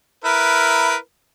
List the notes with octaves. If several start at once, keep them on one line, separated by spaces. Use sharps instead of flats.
E4 A#4 B4